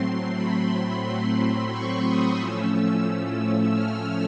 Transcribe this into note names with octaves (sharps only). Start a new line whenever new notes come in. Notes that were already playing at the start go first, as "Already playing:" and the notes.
Already playing: A2 F#3 A3 C4 C6
B5
C6
C#6
D#6
A2 F3 A3 C#4 E6
E6
F6